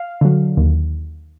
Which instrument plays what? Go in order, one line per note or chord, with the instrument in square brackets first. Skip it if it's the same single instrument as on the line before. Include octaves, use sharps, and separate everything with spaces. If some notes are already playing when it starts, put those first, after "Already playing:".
Already playing: [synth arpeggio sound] F5
D3 F#3
D#2